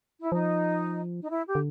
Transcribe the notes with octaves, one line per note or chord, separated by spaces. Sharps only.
E4
F3 D#4
D#4
E4
G4
D3